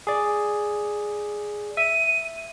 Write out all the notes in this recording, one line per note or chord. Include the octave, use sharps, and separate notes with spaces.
G#4 D5
E5 D#7